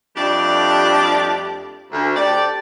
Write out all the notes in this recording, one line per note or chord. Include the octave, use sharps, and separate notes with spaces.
F2 G3 A3 D4 G4 D5
D2
C4 G4 A4 D5